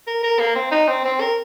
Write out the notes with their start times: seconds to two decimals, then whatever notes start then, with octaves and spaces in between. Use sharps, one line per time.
0.07 A#4
0.23 A#4
0.39 A#3
0.56 C4
0.71 D#4
0.88 C4
1.05 C4
1.20 A#4